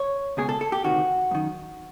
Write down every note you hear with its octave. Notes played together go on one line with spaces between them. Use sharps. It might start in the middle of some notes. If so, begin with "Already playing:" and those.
Already playing: C#5
C#2 B2 G#4
A4
A4
G4
D2 C3 D#3 F#4
F#2 D#3